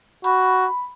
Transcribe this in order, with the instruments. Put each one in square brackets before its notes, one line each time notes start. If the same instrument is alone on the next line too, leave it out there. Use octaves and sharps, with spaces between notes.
[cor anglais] F#4 [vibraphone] B5